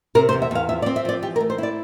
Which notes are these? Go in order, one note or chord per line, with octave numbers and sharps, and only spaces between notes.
C3 A#4
C5
E2
E5
E2 F5
F3 E5
D5
C4
E5
F3 D5
E3 G4
A#4
A3
C5
E4 D5